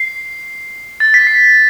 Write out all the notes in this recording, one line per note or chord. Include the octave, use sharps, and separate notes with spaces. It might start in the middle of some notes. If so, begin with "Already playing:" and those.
Already playing: C7
A6
B6
C7